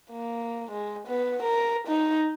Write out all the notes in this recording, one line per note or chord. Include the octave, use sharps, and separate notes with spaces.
A#3
G#3
B3
A#4
D#4